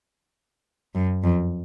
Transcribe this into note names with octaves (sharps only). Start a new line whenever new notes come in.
F#2
F2